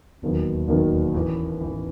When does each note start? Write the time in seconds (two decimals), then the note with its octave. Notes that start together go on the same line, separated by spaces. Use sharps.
0.22 E1 D#2 D#3 F#3 B3
0.68 E1 D#2 D#3 F#3 B3
1.14 A1 A2 E3
1.61 A1 A2 E3